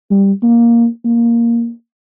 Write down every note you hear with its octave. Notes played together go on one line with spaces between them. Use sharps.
G3
A#3
A#3